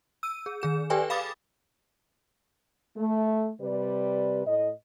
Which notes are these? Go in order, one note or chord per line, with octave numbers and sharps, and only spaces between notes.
E6 D#7
G#4
D#3 G#4 E7
G4 A4 B4 D5 G5 G#5
F5 B5 D6 D#6 A6
A3
C3 G3 B4 D5
A2 D#5